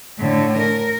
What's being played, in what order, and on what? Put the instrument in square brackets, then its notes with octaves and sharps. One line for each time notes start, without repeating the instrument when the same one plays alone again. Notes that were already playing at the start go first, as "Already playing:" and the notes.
[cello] A2 D3
A#4